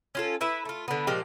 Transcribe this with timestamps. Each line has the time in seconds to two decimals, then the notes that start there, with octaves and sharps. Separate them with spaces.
0.15 C#4 F4 A4
0.41 E4 B4 E5
0.65 A3 F4
0.88 D3 B3
1.07 A#2 F3 G#3 G4